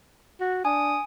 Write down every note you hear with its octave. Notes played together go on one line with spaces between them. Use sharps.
F#4
D4 G#5 D#6